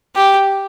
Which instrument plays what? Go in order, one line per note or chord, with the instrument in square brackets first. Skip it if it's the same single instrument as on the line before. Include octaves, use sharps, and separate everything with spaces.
[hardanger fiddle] G4